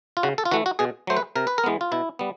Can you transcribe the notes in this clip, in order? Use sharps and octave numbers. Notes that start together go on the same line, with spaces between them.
F4
C#3 F#4
A4
F4
E3 A3 F#4
F#4
B2 G#4
F#3 A3 C5
B4
C3 A#4
B4
A#4
E3 G#3 B3
F4
B2 E4
G3 B3